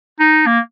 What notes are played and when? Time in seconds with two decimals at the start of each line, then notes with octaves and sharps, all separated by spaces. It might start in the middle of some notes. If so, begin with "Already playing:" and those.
0.19 D#4
0.46 A#3